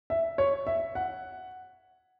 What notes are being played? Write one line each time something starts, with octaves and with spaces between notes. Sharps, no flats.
E5
C#5
E5
F#5